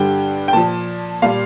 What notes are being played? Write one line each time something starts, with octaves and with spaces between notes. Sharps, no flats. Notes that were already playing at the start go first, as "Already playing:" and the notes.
Already playing: G2 D3 G3 G5
G5
A#2 F3 A5
A#2 G3 F5